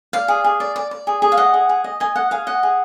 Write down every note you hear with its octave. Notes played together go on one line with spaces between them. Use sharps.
D5 F5
G#4
G#4
D5
D5
D5
G#4
G#4
F5
D#5 F#5
G#4
G#4
D#5
D#5 G#5
D#5 F#5
G#4 F5
D#5 F#5
G#4